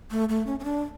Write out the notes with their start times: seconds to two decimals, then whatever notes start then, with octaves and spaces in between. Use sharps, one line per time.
0.11 A3
0.29 A3
0.47 C#4
0.60 C#4
0.64 D4